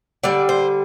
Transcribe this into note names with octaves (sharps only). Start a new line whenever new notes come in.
D3 G3 D5
C5